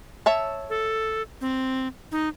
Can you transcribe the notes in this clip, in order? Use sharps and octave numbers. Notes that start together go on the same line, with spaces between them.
C#5 E5 A5
A4
C4
D#4